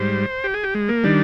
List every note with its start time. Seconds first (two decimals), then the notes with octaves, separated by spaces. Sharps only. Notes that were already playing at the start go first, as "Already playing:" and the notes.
Already playing: G#2 G3 C5
0.44 G4
0.54 G#4
0.64 G4
0.75 G#3
0.88 A#3
1.04 D#3 G3 D4